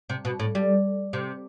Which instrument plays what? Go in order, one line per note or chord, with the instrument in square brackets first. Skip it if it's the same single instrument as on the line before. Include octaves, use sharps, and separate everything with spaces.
[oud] C3
B2
A2
G3
C3